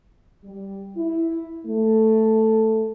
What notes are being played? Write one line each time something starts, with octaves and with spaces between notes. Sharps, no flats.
G3
E4
A3